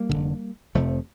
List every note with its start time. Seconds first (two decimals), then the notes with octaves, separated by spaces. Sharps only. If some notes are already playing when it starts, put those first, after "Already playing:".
Already playing: G3 A#3
0.09 F1 F2 D3
0.75 F1 F2 C3 F3 A3